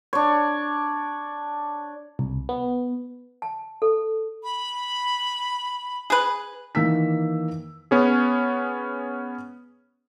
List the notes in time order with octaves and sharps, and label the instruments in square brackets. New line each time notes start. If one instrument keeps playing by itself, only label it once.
[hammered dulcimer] D4 C#5
[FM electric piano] C2
B3
[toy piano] A5
A4
[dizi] B5
[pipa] G#4 B4
[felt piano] D#3 E3 A#3 E6 B6
[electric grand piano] B3 C#4 G#4